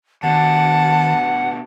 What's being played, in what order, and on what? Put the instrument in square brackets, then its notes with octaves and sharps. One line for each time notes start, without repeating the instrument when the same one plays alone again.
[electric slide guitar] B2 D4 [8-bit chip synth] D#3 [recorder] F#5 [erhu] A5